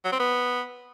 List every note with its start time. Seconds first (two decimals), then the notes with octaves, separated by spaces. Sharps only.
0.05 F#3
0.12 C4
0.20 B3